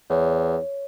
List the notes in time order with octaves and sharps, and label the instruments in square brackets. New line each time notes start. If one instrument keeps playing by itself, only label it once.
[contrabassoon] E2 [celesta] C#5